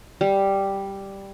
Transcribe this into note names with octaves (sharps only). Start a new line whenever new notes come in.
G3